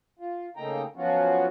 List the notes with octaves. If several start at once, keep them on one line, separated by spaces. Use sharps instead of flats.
F4
C#3 A3 A#3 D#4 G5 A#5
F3 F#3 B3 C#4 F4 F#4